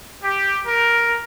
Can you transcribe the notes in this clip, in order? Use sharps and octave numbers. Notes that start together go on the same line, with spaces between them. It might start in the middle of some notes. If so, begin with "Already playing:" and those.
G4
A#4